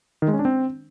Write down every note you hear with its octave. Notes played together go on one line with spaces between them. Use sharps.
D#3
G#3
C#4
D4
C4